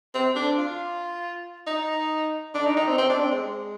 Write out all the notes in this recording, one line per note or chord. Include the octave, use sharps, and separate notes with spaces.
C4
D4
F4
D#4
D4
D#4
D#4
C4
C4
D4
C4
G#3